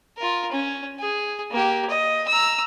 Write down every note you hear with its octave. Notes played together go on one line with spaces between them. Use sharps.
F4 A#4
C#4
G#4
A#3 G4
D#5
A#5 E6